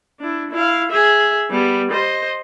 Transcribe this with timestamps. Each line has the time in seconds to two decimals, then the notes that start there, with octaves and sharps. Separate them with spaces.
0.20 D4 E4
0.51 E4 F5
0.91 G#4 E5
1.51 G3 B3
1.92 C5 D#5